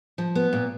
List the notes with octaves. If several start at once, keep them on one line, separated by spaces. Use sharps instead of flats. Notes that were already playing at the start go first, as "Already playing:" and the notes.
F3
B3
A#2